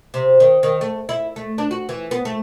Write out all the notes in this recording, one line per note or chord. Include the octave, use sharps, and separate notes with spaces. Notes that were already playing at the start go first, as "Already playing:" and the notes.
C3
D#3
D#3
A3
E4
A3
D4
F#4
E3
B3
A3